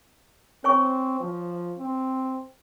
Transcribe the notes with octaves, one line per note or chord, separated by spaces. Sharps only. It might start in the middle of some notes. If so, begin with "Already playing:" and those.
C4 C#5 G#5 C#6
F3
C4